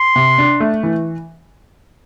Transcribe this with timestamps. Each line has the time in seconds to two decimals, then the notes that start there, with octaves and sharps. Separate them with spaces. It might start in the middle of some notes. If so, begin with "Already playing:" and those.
Already playing: C6
0.16 C3
0.38 D4
0.60 A3
0.83 E3